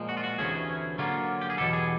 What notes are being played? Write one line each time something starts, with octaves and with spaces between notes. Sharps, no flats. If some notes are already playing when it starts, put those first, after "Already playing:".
Already playing: A#2 F3 G#3
F#4
F4
F#4
D2 C3 E3 A3 C#4 G#4
D3 F#3 A#3 C#4 F4
G4
G#4
E2 B2 G3 A4
G#4